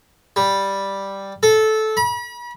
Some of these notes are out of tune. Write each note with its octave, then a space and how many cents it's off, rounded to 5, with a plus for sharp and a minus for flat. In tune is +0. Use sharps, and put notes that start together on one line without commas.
G3 +0
A4 -15
B5 -40